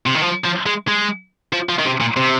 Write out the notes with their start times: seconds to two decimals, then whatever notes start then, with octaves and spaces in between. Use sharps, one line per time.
0.07 C3
0.16 D#3
0.23 F3
0.45 F3
0.66 G#3
0.88 G#3
1.53 F3
1.69 F3
1.79 D#3
1.85 C3
2.00 A#2
2.17 C3